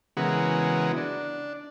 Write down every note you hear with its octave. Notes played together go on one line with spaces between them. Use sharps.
C#3 E3 G#3 B3 F#4 A#4
D4